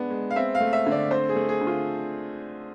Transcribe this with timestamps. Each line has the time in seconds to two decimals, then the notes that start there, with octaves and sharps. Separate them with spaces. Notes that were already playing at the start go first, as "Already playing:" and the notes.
Already playing: G#3 B3 D4
0.10 G#3
0.31 F5
0.36 C4 E5
0.55 F5
0.60 A3
0.73 E5
0.86 D3
0.91 D5
1.11 C4 C5
1.29 G#4
1.36 A3
1.49 G#4
1.61 D3
1.67 F4